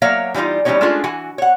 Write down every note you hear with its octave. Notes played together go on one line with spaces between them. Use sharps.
F#3 A#3 C#5 E5 F5
E3 G3 A3 D#4 F4
E3 G3 A#3 C#4 D#4 C#5
G#3 A3 C#4 D4 F4 G#4
E3 F#4 G#5
C#5 F#5